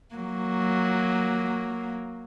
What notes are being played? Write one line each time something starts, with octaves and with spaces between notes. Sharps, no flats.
F#3 A#3